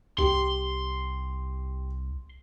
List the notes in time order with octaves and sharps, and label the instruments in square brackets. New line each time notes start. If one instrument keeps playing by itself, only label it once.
[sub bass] C2 [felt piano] G4 [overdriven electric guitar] C6